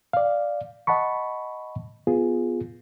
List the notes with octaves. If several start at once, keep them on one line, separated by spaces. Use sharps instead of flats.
D5 F5
D#5 F#5 A5 B5 C#6
B3 F4 G#4